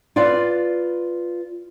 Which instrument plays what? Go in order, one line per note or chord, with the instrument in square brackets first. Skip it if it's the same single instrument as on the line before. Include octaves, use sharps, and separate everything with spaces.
[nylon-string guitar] F4 B4 D5 F5